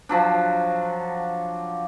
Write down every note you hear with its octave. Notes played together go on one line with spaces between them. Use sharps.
F3 F#3 D4